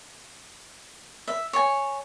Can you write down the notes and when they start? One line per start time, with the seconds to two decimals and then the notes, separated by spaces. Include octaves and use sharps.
1.28 E5
1.53 C#5 G#5